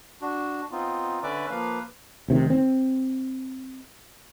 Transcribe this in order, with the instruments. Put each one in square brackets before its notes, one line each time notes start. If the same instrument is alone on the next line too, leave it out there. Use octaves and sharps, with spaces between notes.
[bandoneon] D4 F#4
B3 C4 D#4 F4
D3 C#4 B4 D5 E5 D6
F3 A#3 B4 F5
[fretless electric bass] F1 C3 D#3
C4